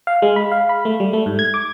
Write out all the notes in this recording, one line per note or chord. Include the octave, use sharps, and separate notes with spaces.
F5
G#3
B5
F5
B5
A3
G3
A3
G#2
G#6
D6